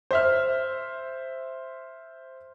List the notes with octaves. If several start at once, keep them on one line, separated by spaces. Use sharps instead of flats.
C5 E5 F6